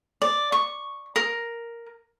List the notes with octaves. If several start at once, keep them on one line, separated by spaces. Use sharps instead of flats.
D5
C#6
A#4